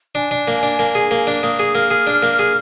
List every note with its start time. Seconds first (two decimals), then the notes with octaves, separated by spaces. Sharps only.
0.15 D4 G#5
0.31 D4
0.48 A#3
0.63 D4
0.79 A#3
0.95 G#4
1.11 A#3
1.27 D4
1.43 A#3 D#6
1.59 G#4
1.75 A#3 F6
1.91 G#4
2.07 D4
2.23 A#3
2.39 G#4